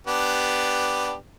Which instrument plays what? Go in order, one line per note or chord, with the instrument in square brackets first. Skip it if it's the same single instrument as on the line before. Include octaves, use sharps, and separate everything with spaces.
[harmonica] B3 D4 G4